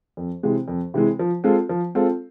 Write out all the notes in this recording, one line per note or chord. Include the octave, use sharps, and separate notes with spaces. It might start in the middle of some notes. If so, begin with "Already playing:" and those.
F2
C3 E3 G#3
F2
C3 E3 G#3
F3
G#3 C4 F4 A4
F3
G#3 C4 F4 A4